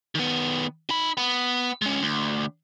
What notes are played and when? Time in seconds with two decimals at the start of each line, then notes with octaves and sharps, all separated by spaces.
0.15 D#3 B3
0.89 D#4 B5
1.17 B3
1.82 G#3 C#4
2.02 D2